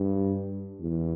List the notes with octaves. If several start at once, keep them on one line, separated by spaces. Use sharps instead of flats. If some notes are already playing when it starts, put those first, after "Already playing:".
Already playing: G2
E2